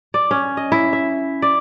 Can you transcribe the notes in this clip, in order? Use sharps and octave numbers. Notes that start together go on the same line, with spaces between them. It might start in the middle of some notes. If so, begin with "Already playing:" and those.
D5
C#4
D#5
E4
E5
D5